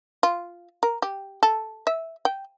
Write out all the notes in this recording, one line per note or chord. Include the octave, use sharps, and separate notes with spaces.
F4
A#4
G4
A4
E5
G5